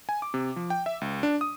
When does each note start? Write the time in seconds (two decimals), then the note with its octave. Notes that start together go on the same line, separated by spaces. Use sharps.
0.09 G#5
0.22 D6
0.34 C3
0.56 F3
0.70 G5
0.86 E5
1.01 C#2
1.23 D4
1.41 D#6